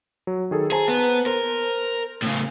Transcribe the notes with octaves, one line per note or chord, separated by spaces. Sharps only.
F#3
D#3 G#4 A4
G#4 C5 A5 A#5
B3
A#4 C5
A2 C#3